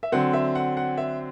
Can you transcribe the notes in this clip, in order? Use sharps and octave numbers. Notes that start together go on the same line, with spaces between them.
E5
D3 F#3 C4 F#5
E5
F#5
F#5
E5